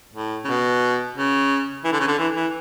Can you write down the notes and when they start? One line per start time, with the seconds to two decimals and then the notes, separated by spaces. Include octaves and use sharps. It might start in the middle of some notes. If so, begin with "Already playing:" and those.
0.14 A2
0.45 C#3
0.48 B2
1.17 C#3
1.85 E3
1.92 D3
2.00 C#3
2.08 D3
2.19 E3
2.36 E3